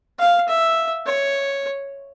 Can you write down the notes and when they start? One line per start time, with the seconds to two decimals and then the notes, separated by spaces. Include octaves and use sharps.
0.19 F5
0.48 E5
1.06 C#5